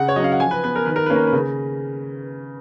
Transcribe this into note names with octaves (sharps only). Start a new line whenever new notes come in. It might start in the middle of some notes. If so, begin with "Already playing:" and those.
Already playing: C#3 F#5
C#5
F#3 C#4 D#5 F5
F#5
F3 G#5
B4
B3 B4
A#4
D#3 B4
A#4
A#3 C#4 B4
A#4
B4
C#3